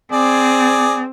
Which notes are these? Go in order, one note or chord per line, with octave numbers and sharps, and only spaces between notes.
C4 G#4 D5